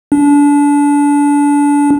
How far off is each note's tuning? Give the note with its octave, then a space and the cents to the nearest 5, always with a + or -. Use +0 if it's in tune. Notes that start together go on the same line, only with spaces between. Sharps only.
D4 -30